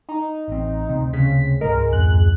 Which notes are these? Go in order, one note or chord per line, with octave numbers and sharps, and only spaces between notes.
D#4
A1 C4
D2 C3 C4
C#3 B6
C#2 G#2 G#3 A#4
F2 F#6